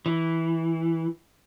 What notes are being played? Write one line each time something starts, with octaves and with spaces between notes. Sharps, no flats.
E3